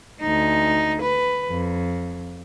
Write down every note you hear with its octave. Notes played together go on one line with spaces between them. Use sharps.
D2 D#4
B4
F2